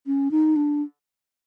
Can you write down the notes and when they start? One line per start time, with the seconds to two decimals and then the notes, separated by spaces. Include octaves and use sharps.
0.06 C#4
0.31 D#4
0.56 D4